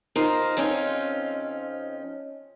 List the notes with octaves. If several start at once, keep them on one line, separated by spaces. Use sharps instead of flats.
D#4 F4 A#4 C5
F2 C4 C#4 D#4 F4